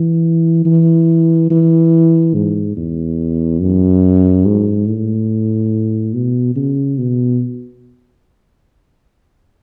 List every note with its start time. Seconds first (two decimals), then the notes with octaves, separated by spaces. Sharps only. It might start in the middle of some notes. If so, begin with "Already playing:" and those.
Already playing: E3
0.65 E3
1.50 E3
2.34 G#2
2.77 E2
3.61 F#2
4.45 G#2
4.87 A2
6.14 B2
6.55 C#3
6.98 B2